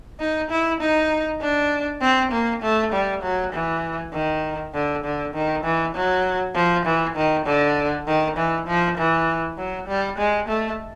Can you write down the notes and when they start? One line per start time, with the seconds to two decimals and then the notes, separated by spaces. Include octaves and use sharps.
0.20 D#4
0.50 E4
0.81 D#4
1.41 D4
2.01 C4
2.32 A#3
2.62 A3
2.93 G3
3.23 F#3
3.53 E3
4.13 D#3
4.74 D3
5.04 D3
5.34 D#3
5.64 E3
5.95 F#3
6.55 F3
6.86 E3
7.16 D#3
7.46 D3
8.07 D#3
8.37 E3
8.67 F3
8.97 E3
9.58 F#3
9.88 G3
10.18 G#3
10.48 A3